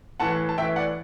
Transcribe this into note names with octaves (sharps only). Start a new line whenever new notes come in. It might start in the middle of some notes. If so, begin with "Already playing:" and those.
A2 E3 F#5 A5
A5
A2 E3 E5 G5
D5 F#5